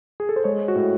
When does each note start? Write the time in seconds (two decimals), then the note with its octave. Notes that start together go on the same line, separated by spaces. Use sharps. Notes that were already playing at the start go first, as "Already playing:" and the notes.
0.20 G#4
0.29 A4
0.36 C5
0.44 G#3 C#5
0.68 F#4
0.75 A2